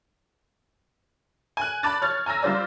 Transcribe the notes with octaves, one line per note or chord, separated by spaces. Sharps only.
G#5 F#6
A5 B5 D6 F#6 A6
C#5 F6 A6
G#5 A#5 E6 A#6
G3 F4 C5 D5